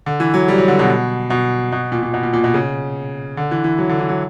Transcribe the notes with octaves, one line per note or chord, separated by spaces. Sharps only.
D3
E3
F#3
G3
F#3
D3
B2
B2
B2
A#2
A#2
B2
A#2
A#2
B2
C#3
D3
E3
E3
F#3
D3
E3
F#3